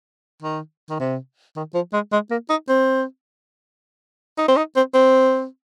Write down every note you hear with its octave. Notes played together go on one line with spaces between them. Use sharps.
D#3
D#3
C3
D#3
F3
G#3
G#3
A#3
D#4
C4
D#4
C4
D#4
C4
C4